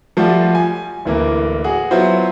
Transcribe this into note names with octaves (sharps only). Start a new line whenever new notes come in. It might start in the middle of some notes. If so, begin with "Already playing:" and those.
F3 G3 A3 F4 F#4
G#5
D1 E3 A#3
F#4 G#4
F#3 B3 E4 F4 C5